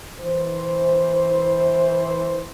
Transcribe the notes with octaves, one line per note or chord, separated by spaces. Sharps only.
E3 C5